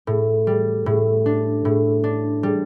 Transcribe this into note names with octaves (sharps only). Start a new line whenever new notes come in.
A2
G3
A2
D4
A2
D4
G3